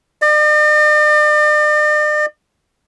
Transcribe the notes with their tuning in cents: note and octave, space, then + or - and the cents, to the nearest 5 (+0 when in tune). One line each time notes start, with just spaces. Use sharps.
D5 +45